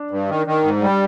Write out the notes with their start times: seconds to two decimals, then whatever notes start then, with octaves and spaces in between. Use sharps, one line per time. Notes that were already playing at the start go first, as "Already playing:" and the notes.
Already playing: D4
0.11 G2
0.29 D#3
0.46 D#3
0.63 G#2
0.82 G3